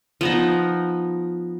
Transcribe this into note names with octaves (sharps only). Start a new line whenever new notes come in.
F3 B3 D#4